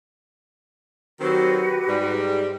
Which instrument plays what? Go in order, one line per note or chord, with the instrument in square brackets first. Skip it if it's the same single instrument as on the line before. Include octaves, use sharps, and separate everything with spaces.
[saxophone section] D#3 F#3 C4 [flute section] F#4 G4 B4
[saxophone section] G#2 G3